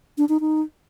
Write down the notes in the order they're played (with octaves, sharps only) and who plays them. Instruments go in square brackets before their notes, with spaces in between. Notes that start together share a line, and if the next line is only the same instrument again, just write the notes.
[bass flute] D4
D#4
D#4